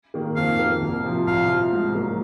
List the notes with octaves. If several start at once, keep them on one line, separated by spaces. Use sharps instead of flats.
D#3 A#3
F2 F5
D#3 A#3
C2
C3 F3
C2 F5
C3 F3
G#2
F#3 A#3